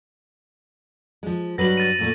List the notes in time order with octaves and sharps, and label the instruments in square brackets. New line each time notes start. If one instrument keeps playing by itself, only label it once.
[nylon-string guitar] F3 G#3
[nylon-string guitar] G2 F#3 B4 [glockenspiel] A#6 F#7
[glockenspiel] A6 D#7
[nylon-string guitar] A#2 A3 A#3